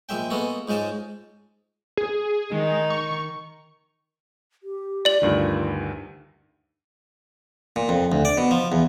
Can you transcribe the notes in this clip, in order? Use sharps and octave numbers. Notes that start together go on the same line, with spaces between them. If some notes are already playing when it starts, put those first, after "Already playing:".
A#1 G#3 E5 G5
G#3 A#3 B3 F#4 A4
C#2 G#2 G#3 F5 A5
G#4
D#3 G#3 D#4
C#6
G4
D5 F#7
D2 G2 D#3 F4
A#2
F2
D2
D5
B2
F3
E2